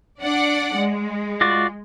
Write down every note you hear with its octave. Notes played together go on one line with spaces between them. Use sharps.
D4 D5 F#5
G#3
F4 F#4 D5